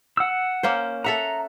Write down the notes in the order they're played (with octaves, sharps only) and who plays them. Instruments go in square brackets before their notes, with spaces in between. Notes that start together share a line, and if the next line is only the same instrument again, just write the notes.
[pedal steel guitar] F#5 E6
[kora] A#3 C#4 C5
[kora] A4 E5 F#5 [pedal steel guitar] A#5